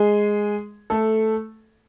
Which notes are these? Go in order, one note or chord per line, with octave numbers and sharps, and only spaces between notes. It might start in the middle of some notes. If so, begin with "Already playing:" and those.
Already playing: G#3 G#4
A3 A4